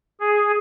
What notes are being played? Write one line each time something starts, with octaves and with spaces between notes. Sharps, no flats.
G#4